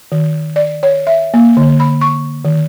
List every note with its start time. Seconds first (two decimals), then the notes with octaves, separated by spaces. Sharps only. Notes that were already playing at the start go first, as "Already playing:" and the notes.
0.12 D#3
0.56 D5
0.83 C#5
1.07 E5
1.34 A#3
1.57 D3
1.80 B5
2.01 C#6
2.45 D#3